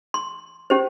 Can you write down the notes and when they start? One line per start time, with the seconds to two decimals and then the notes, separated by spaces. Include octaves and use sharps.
0.14 C6
0.70 C#4 G4 C5